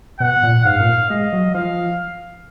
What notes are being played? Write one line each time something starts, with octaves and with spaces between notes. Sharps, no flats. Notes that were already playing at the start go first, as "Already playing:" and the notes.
B2 F#5
A#2
G#2 F5
A#2
G#3 D#5
F#3
F3 F5